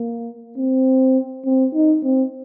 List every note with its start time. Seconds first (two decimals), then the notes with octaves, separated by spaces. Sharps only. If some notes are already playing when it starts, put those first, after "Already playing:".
Already playing: A#3
0.58 C4
1.45 C4
1.74 D#4
2.03 C4